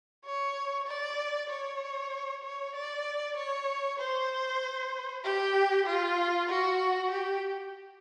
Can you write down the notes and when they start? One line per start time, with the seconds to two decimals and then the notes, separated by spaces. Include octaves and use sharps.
0.25 C#5
0.87 D5
1.50 C#5
2.43 C#5
2.75 D5
3.37 C#5
3.99 C5
5.24 G4
5.86 F4
6.49 F#4
7.11 G4